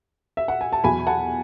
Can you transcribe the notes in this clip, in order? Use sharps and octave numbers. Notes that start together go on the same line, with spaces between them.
E5
F#5
G#5
A5
E2 B2 F#3 G#5 B5
F#5 A5